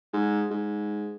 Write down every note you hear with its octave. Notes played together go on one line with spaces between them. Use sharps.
G#2
G#2